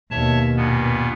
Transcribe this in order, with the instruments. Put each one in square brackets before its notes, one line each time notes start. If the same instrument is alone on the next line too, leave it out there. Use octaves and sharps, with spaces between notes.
[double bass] D#2 B2 [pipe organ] C#5 E5 A5
[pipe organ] G2 A#2 B3